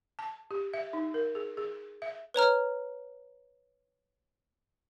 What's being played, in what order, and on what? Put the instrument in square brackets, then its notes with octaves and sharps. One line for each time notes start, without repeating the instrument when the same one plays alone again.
[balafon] A5
G4
E5
D#4
A#4
G#4
G#4
E5
[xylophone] B4 C#5 A#5 F6